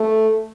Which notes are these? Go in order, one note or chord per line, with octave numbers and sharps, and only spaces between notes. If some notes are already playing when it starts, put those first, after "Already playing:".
Already playing: A3